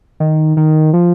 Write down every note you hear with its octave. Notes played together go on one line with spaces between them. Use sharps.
D#3
D#3
F3